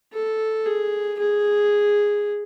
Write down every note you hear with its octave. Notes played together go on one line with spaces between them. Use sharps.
A4
G#4
G#4